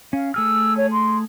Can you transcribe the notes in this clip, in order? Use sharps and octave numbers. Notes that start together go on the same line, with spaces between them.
C#4 F5
A3 G#4 E6 F6
C#5
C6